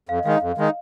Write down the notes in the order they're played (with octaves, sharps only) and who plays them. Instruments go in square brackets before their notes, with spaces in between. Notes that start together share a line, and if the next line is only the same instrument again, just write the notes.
[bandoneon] F2 [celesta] F5
[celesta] D#5
[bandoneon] D#3 G#3 D#4 [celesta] F5
[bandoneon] F2
D#3 G#3 D#4